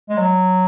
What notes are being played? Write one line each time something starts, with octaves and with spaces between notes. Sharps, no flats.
G#3
F#3